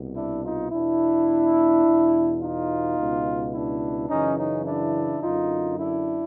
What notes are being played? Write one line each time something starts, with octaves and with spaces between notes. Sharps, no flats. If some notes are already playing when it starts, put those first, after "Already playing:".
Already playing: C2 B2
D4 E4
D#4 F4
E2 B2 D4 E4
E2 B2
D#4 F4
C#2 B2
D4 E4
F#2 C#3 E3 C#4 D#4
C#4 D#4
D4 E4
F#2 D3 D#4 F4
D4 E4